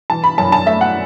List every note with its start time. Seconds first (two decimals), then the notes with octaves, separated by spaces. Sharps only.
0.10 E3 A5
0.24 B5
0.38 F#2 A5
0.52 A5
0.66 A3 E5
0.81 F#5